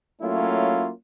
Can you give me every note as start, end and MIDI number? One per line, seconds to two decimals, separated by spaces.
0.22 0.91 54
0.22 0.91 57
0.22 0.91 58
0.22 0.91 61
0.22 0.91 64
0.22 0.91 65